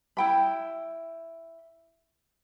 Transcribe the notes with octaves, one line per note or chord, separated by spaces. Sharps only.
E4 G5 B5